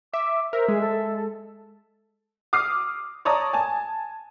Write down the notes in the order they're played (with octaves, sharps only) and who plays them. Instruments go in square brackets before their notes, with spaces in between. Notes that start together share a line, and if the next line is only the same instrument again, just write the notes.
[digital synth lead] E5 [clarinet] D6
[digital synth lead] A#4 [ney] C5 [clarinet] E5
[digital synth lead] G#3 [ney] G#4
[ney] A4
[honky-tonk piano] D6 D#6 F6 C7
C#5 D5 A5 A#5 D#6
G#5 A5